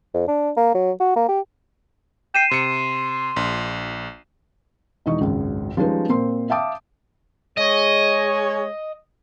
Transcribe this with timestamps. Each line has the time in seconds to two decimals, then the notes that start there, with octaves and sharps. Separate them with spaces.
0.14 F2
0.28 D4
0.57 A#3
0.75 F#3
1.00 F#4
1.16 A#3
1.29 G4
2.35 G5 C7 D#7 E7
2.51 C3 C6 C#7
3.36 A#1
5.06 E1 E3 D#4 D#5 C#6
5.21 G#1 C#2 F#2
5.77 F3 G3 G#3 C#4 D#4 B4
6.09 A#2 A#3 C4 C6
6.50 E5 F5 G5 A5 D6 D#6
7.58 G#3 G#4 C#5 D#5